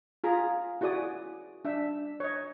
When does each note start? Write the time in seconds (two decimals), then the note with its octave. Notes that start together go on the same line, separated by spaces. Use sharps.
0.24 F4 G#4 A#5
0.81 E4 F#4 G#4 D5 D#6
1.65 D4 E5
2.20 C#5 D#5